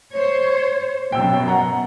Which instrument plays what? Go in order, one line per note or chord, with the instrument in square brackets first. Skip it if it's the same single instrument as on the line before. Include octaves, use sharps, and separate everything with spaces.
[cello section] C5 C#5
[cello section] F#2 B2 [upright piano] G5 E6
[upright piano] F#5 A#5